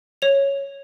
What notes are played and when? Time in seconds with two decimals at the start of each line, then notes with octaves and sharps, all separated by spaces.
0.22 C#5 F7